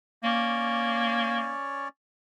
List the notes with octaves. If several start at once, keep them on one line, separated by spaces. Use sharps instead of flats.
A#3 C#4 C#5 D5